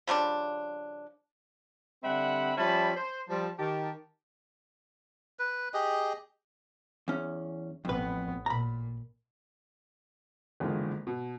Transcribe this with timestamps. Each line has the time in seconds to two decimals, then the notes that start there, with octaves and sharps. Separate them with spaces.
0.07 C#3 F3 G3 D4
2.04 D3 G3 C4 E5 F#5 B5
2.57 F3 G3 C#4 E5 A5 B5
2.97 C5
3.29 F3 G3 A5
3.59 D#3 G4 A5
5.39 B4
5.74 G4 G#4 D#5
7.08 E2 C#4
7.85 A1 F2 B3 B4
8.46 A#2 A#5 B5
10.60 F#1 E2 D3 D#3 G#3 F4
11.07 B2